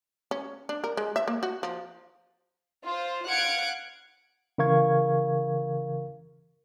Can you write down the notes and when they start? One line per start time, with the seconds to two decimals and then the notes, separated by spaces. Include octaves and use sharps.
0.31 C#4
0.69 D4
0.84 A#4
0.97 G#3
1.16 E5
1.28 A#3
1.43 F#4
1.63 F3
2.85 F4 C5
3.28 F5 F#5 F#6 G#6 C#7 D7
4.58 C#3 E3 A#4 F5 C#6 G#6